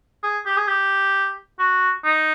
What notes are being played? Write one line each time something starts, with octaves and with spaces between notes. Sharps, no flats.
G#4
G4
G#4
G4
F#4
D#4